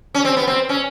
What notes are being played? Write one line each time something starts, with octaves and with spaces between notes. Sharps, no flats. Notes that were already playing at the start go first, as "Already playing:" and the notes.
C#4
C4
B3
C4
C#4